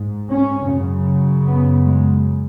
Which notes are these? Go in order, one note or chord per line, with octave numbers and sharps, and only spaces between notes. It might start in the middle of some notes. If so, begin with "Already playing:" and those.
Already playing: G#2
C#4
F#2 C#3
B3
G#3